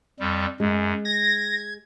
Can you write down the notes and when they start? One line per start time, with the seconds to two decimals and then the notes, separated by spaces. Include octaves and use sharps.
0.20 F2 G3
0.60 F#2 G#3
1.05 G#6 A#6